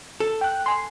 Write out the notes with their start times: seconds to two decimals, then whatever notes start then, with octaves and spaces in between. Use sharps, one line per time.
0.20 A4
0.41 G5 F#6
0.66 G#5 C6